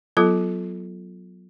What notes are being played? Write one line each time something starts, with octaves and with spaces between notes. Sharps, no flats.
F#3 B3 F4 A4